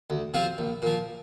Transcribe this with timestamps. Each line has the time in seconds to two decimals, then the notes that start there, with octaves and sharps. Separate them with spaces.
0.10 D2
0.34 C3 F3 C4 F4
0.58 A#1
0.82 A#2 F3